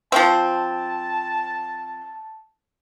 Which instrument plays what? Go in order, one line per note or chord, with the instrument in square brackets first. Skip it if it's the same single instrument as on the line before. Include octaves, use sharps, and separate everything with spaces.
[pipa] F3 C4 [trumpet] A5